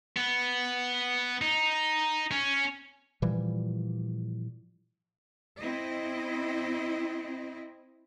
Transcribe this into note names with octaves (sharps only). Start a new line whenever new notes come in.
B3
D#4
C#4
A#2 E3 F3 G3
C4 E4 D#5